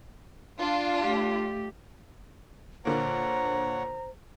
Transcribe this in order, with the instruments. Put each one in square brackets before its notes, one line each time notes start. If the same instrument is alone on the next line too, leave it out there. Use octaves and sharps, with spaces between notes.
[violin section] D4 F4
[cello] A3 G4
[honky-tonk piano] A#2 D3 A#3 [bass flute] C5 [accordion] C#5 F#5 [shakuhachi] A#5